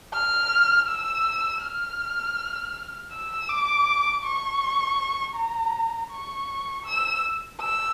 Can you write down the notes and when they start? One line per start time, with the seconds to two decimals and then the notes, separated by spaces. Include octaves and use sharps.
0.14 F6
0.88 E6
1.62 F6
3.12 E6
3.49 D6
4.24 C#6
5.36 A#5
6.11 C#6
6.85 E6
7.60 E6